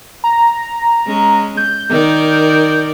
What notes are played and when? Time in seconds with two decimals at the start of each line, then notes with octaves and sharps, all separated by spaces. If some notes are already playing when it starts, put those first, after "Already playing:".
0.24 A#5
1.07 G#3 C#4
1.57 G6
1.90 D#3 A#4 D5